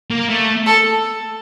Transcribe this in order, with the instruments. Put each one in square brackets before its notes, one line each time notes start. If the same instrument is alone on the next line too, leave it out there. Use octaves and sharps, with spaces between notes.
[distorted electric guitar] A#3
A3
[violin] A4